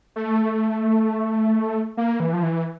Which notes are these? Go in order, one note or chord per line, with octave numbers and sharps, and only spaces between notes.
A3
A#3
E3
F3
E3